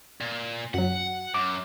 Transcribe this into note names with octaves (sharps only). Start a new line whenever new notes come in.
A#2
F#2 F#3 F#5
F#2 D6